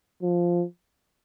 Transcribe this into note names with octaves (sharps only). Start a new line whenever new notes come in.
F3